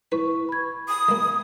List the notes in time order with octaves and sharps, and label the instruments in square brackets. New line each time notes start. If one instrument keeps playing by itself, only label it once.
[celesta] E4 C#6 [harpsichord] B4
[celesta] B5 G#6
[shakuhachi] D#6
[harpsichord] G#3 A#3